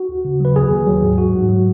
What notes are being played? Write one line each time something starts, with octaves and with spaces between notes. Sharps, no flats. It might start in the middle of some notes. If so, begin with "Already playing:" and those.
Already playing: F#4
D#2
C#3
F#3 B4
D#2 G#4
D#2
F#3
G#2
F#3 F#4
G#2
F#3